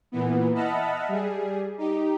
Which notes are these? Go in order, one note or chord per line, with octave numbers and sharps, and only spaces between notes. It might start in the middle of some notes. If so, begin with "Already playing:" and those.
A#2 E3 B3
D#5 E5 F#5 A5 B5 F6
G3 G#4
D#4 G4